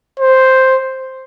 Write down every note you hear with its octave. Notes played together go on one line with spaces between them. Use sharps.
C5